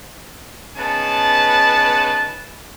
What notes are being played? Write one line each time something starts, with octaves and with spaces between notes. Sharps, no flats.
C#3 B3 D#4 B4 A5